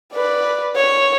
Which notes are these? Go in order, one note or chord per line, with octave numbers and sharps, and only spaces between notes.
B4 D5
C#5